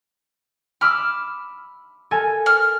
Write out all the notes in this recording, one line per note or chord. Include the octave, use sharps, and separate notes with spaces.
B5 D6 E6 F6
A4 A#4 G#5
F6